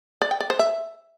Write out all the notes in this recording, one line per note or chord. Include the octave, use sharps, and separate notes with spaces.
D5
G5
D5
C5
E5